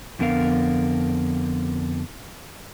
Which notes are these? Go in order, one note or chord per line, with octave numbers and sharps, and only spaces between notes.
F2 D3 B3 A#4 F5